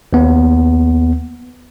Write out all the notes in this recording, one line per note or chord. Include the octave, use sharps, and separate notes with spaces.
D#2 B3